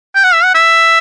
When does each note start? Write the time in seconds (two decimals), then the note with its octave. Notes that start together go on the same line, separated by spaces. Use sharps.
0.16 G5
0.24 F#5
0.33 E5
0.43 F#5
0.55 E5